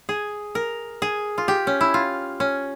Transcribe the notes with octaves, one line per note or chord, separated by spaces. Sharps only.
G#4
A#4
G#4
F4
G4
C#4
E4
F4
C#4